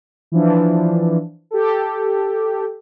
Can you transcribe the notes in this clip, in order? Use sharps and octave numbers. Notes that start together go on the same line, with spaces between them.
E3 F3 D4
G4 A4